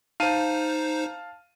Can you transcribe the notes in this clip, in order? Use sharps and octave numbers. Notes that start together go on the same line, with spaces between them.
D#4 C5 F5 A5 D#7